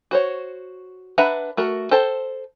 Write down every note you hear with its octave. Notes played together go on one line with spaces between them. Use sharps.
F#4 C5 C#5
D4 B4 E5 F#5 A#5
A3 F#4 A#4
A4 C5 G5 A5